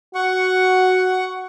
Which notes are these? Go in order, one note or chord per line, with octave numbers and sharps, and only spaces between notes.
F#4 F#5 C#6